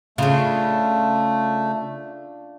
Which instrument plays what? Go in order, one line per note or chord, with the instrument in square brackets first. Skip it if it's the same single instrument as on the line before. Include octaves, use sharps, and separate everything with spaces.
[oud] C#3 [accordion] A3 [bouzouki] D4 F4